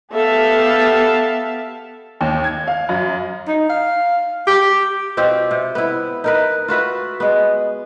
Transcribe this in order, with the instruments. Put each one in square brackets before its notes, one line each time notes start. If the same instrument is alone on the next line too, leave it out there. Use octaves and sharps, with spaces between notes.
[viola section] B3 G4 A4 E5 F5 A5
[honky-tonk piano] D#2
G#6
F5
F#2
[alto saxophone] D#4
F5
G4
[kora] B2 C4 F4 G4
C3
B3 E4
D#4 A#4 B4
F4 F#4 B4 E5
G#3 B3